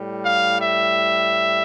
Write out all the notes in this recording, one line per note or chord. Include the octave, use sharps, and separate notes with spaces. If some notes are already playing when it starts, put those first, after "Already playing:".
Already playing: A2 G3
F5
E5